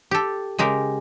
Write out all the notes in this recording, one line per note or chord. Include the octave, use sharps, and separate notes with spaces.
G4 A4
C#3 G#3 G4 A#4